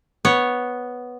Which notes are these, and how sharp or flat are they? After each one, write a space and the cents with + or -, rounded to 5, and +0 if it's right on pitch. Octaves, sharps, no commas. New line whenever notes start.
B3 +0 C#5 +0